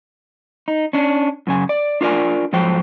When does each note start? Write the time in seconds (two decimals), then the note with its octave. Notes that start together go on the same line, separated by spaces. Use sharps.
0.68 D#4
0.93 C#4 D4
1.47 F#2 C#3 G#5
1.69 D5
2.01 D4 F4 A#4 D5 G#5
2.53 G#2 F3 F#3 C5 G5